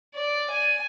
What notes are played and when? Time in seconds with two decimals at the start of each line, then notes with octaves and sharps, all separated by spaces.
0.15 D5
0.50 G#5